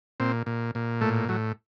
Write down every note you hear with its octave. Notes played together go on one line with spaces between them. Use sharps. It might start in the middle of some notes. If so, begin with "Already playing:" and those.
A#2 C4
A#2
A#2
A2 A3
A2 F#3